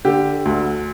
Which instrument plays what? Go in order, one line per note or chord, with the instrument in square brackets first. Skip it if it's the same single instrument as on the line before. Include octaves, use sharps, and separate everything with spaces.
[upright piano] D3 G4
D2